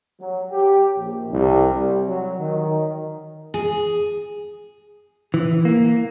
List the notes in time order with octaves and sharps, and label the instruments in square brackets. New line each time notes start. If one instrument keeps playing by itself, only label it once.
[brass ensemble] F#3
G4
A#1
C2
G3
F#3
D#3
[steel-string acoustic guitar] G#4
[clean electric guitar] E3
A#3